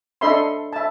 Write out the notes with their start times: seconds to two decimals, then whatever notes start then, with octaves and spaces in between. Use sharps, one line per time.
0.21 D4 A4 D#5 E5 B5 C6
0.73 E5 A5